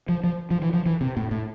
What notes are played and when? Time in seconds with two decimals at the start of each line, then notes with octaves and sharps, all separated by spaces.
0.09 F3
0.24 F3
0.51 F3
0.62 E3
0.73 F3
0.86 E3
1.01 C3
1.17 A2
1.31 A2